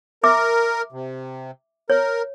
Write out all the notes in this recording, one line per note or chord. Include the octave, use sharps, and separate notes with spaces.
A#4 E5 D6
C3
A#4 C#5